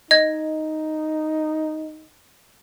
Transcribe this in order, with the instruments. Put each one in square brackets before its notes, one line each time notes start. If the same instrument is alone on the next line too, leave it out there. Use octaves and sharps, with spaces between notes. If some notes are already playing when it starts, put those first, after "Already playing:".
[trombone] D#4 [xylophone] D#5 G#6